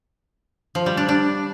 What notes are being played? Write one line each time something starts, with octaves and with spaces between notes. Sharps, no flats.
F3
G3
D4
D4